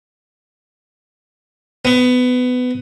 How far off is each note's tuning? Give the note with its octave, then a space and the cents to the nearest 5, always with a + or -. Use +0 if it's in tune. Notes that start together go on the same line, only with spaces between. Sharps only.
B3 +20